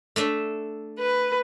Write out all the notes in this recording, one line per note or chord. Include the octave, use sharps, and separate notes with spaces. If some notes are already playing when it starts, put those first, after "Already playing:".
A3 D4 E5
B4